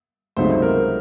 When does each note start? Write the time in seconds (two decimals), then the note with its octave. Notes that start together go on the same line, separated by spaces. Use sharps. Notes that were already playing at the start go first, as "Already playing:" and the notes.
0.37 C#2 C3 F#3 A3 D#4 C5
0.51 C5
0.62 A#4